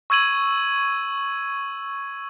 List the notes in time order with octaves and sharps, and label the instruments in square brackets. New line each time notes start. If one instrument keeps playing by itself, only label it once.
[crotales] C#6 E6 G#6 D#7 F#7